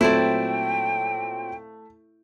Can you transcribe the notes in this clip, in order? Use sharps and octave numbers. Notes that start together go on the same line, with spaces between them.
A#2 F#3 A3 C4 E4 C5 D5 G5